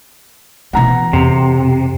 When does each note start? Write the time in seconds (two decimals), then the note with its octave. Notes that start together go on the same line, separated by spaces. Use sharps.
0.73 B2 E3 F#5 A#5
1.13 F2 C3